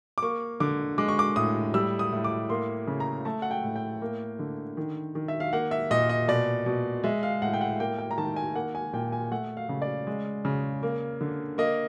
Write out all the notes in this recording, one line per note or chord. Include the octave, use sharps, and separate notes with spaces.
D6
A#3 C#6
D3 D6
G#3 D6
C#6
D6
A2 D#6
G3 E6
D#6
A2
D6
A#3 C6
C#3
A#5
A3 A5
F#5
G5
A2
G5
A#3
D3
D#3
D#3
E5
F5
A#3 F#5
E5
A#2 D#5
D#5
B2 D5
B2
G#3 E5
F5
A2 F#5
G5
F#5
A#3 G5
G5
A#5
D#3 A5
G#5
A#3 F#5
G#5
A#2 G5
G#5
A3 F#5
F5
C#3
D5
G#3
C#3
A#3
D3
A#3 D#5